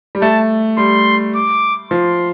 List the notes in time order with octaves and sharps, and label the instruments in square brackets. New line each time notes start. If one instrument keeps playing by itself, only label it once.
[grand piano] G3
[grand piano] A3 [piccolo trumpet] A5
[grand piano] G3 [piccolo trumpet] C6
[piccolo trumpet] D6
[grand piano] F3 [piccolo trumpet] C6